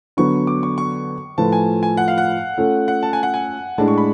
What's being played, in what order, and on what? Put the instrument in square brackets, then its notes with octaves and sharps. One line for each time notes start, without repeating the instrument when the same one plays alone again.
[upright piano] D3 F#3 B3 [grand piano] C#6
[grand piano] D6
C#6
C#6
[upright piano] A2 F3 A3 F4 B4 [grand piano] A5
[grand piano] G#5
G#5
F#5
F5
F#5
[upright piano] A3 C#4 F4 A4
[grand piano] F#5
A5
G#5
F#5
G#5
[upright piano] A2 G#3 D4 [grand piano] A5
[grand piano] C#6
B5